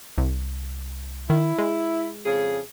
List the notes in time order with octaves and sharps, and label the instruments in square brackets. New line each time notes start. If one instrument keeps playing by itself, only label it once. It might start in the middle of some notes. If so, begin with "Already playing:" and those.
[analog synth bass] C2
[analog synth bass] D#3 [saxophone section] E4
[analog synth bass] G#3
[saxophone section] F2 C#3 G#4